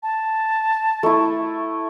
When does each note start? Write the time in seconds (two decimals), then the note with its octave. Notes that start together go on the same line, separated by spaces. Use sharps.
0.03 A5
1.03 A3 E4